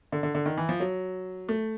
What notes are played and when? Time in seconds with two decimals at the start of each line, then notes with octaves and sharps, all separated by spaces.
0.12 D3
0.23 D3
0.35 D3
0.46 D#3
0.58 E3
0.69 F3
0.80 F#3
1.49 A3